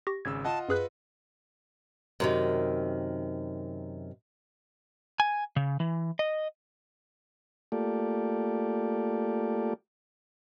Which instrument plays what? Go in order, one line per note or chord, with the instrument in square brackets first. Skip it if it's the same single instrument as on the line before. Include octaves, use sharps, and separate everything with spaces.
[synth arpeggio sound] G4 C#6 A#6
[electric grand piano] G#1 C#3 E6 [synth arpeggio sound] G#6
[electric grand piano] F4 D#5 F#5 [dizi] A5
[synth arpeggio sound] F#2 G#4 F#6 [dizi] B4
[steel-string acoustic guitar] F#2 C3 D#3
[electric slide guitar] G#5
C#3
E3
D#5
[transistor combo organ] A3 A#3 F4 G4 A4 D5